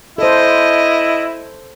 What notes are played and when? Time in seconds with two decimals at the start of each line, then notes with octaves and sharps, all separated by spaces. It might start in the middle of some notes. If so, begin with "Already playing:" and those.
0.18 E4 A4 C5 D#5